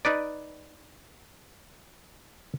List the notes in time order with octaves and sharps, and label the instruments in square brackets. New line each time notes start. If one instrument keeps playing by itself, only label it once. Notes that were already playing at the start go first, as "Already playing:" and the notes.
[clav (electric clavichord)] D#4 B4 D5